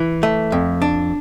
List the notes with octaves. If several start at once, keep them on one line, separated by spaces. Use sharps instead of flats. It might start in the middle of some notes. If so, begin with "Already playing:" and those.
Already playing: E3
A3
F2
D4